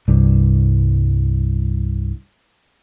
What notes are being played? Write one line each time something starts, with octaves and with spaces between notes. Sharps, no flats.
C2 G2